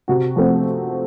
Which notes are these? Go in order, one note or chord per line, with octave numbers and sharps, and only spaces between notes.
C3 F#4
F3 A3 C4